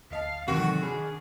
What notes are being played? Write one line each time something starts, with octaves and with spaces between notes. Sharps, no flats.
D2 D#5 F5 A5
G#2 C3 D#3 E3 F#3 F#4 A4 A#4
D#3 D4 G#4 B5 F6 F#6